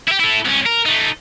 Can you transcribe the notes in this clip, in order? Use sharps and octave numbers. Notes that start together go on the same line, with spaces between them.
E4 G4
E4 A4
C2 C#4
A#4
A3 D#4